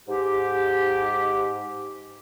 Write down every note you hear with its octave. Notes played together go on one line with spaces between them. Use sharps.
G#2 G4